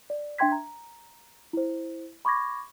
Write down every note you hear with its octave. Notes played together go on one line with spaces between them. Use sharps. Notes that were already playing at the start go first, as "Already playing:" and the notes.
D5
D4 E5 G5 C6 G#6 B6
A#5
E4 C5
B5 C#6 D6 G#6 A#6